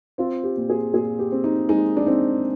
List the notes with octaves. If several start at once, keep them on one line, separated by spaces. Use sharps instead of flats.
C4 F4
G4
A#2
G#4
A#2 G#4
G4
C4
D#4
G#3 D#4
D4
C4 D#4